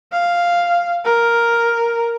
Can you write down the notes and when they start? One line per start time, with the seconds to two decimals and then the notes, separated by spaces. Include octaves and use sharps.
0.12 F5
1.05 A#4